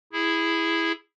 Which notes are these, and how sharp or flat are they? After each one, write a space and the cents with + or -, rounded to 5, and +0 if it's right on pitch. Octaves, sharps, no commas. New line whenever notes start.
E4 +0 G#4 -10